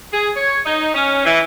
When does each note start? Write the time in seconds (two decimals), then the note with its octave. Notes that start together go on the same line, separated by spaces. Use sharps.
0.13 G#4
0.35 C#5
0.64 D#4
0.94 C#4
1.24 E3